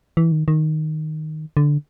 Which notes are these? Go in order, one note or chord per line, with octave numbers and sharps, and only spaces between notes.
E3
D#3
D#3
D3